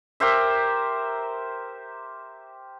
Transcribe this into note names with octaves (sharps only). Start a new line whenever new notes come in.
G4 A#4 C5 E5